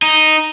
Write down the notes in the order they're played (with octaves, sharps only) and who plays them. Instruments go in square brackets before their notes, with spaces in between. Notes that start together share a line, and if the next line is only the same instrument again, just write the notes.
[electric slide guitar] D#4